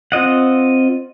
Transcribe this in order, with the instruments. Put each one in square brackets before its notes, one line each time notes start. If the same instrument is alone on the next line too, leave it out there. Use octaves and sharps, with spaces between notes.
[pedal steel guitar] C4 F4 D#5 F#5